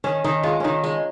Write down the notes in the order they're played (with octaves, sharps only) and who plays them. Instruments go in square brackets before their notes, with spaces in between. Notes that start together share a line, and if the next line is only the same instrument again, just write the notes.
[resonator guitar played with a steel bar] D#3 [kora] C#4
[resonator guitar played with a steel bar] D#3 [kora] D#4
[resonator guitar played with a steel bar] G#3 [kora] F4
[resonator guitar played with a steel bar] D#3 [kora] C#4 D#4
[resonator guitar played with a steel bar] G#3